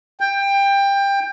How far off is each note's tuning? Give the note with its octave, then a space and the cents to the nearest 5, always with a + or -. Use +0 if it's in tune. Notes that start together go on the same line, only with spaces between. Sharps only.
G5 +20